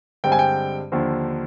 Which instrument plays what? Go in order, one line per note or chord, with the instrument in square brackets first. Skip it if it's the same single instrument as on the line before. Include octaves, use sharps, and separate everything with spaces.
[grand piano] G2 D3 G#3 C4 G5
G#5
G5
D#2 D3 F3